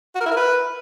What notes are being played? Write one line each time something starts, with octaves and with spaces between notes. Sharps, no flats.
F#4
A#4
E4
A#4
B4